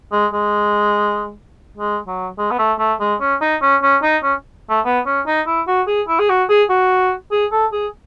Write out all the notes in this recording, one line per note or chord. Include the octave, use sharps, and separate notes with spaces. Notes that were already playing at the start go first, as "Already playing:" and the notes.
G#3
G#3
G#3
F#3
G#3
B3
A3
A3
G#3
C#4
D#4
C#4
C#4
D#4
C#4
A3
B3
C#4
D#4
E4
F#4
G#4
E4
G#4
F#4
G#4
F#4
G#4
A4
G#4